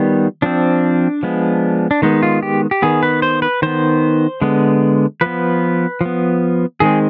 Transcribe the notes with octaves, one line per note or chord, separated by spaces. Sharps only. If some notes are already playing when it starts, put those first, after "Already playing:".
Already playing: D#3 G3 B3 F4
F3 C4 D4
F3 G#3 B3
D4
D#3 G#3 B3 D#4
F4
G4
G4
D#3 B3 G#4
B4
C5
B4
D#3 B3 C5
D3 G#3 B3
F3 B3 B4
F3 B3
D#3 G#3 C4 G#4